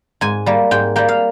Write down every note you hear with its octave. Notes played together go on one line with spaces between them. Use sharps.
G#2 G#5
G3 A#3
G#2 G5
G3 A#3 G5
F5